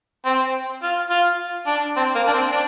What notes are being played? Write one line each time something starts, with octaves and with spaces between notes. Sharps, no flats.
C4
F4
F4
D4
C4
A#3
D4
C4
D4